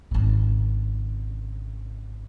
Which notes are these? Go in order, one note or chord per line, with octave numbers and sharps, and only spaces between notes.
G#1 C#3